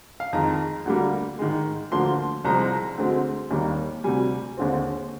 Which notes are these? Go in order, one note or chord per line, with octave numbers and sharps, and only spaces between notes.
F5
F2 D#3 G#3 A#5
D2 D3 G3 A#3
G#2 D#3 G#3
D2 D3 F3 A#3 C6
C2 C3 F3 G#3 C4 A#5
D2 D3 G#3 C4
D#2 D#3 G3 A#3
D2 C3 G3 G#5
D#2 D3 G#3 C4